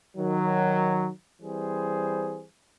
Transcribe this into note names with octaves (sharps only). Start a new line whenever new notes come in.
D#3 F#3
E3 G3 C4 G#4 C5